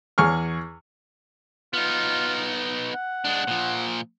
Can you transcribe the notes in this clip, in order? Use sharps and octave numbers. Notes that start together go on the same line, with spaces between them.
E2 G#4 C#6 F6
B3 D#4 F4
F#5
G#3 D4
A#2 F3